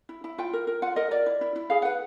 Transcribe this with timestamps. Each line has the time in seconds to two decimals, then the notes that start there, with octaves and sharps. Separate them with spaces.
0.09 E4
0.24 E4
0.38 F4 G5
0.53 A#4
0.67 A#4
0.82 F4 F#5
0.96 A#4 D#5
1.11 A#4 D5
1.26 E4
1.41 E4
1.56 E4
1.70 G#4 F5
1.82 B4 F#5